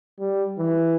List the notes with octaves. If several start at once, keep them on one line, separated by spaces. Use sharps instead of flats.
G3
E3